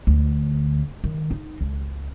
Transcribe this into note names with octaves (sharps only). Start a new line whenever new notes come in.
D2
D#3
D#4
C#2